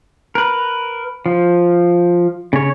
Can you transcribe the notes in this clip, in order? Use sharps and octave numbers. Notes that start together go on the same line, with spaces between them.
A#4 B4
F3
C#3 C#5